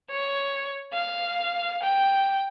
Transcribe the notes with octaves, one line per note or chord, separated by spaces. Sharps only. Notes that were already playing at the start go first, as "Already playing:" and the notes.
C#5
F5
G5